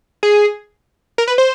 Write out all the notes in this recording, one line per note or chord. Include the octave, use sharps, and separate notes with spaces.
G#4
A#4
B4
C5